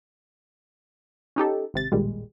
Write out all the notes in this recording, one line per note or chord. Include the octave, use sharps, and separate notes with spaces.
C#4 D#4 G4 A4
G#1 C3 A6
A1 D#2 A#2 G3 G#3